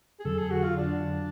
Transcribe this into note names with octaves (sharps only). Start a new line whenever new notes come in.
G#4
F2 D3 F#3 A4
G#4
F#4
F4
D4